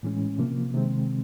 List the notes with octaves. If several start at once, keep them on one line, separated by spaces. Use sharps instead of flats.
A2 E3 G#3 C#4
C3 F3 A#3
C3 D#3 G#3 C4